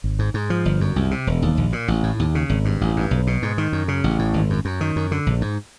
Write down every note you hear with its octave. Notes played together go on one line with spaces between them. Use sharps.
G#1
G#2
G#2
F3
G1
F#2
C2
C3
E1
D#2
A#1
A#2
A1
A2
D#2
C#3
G#1
G2
A1
G2
B1
B2
G#2
D#3
F#2
C#3
A1
A2
G#1
F#2
F#2
D#3
F#2
D3
A#1
G#2